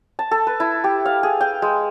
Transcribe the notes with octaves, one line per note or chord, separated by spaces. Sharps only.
A5
A4
B4
E4
G4
F5
G#4
G5
G#3